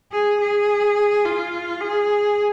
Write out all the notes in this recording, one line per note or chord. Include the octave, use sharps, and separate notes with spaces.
G#4
G#4
F4
G#4